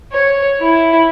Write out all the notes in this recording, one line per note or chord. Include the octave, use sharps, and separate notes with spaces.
C#5
E4